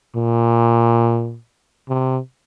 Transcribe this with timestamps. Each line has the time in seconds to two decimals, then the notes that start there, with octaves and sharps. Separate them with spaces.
0.16 A#2
1.89 C3